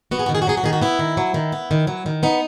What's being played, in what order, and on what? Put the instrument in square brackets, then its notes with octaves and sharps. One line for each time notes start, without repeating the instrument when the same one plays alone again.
[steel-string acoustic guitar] B3 F#4
G#4
F#4
D#3
G#4
F#4
F#3 G#4
F#4
D#3 G#4
F#4
B3 E4
D#3
F#3
D#3
B3
D#3
F#3
D#3
B3 D#4